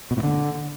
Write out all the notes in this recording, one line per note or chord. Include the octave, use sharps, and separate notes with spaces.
B2
A2
D3